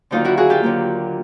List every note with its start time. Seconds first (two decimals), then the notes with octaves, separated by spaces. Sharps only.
0.11 D#2 D3 F#3 A#3 D#4 F4
0.25 E4 F#4
0.37 F#4 G#4
0.50 F4 G4
0.63 D#2 D3 F#3 A#3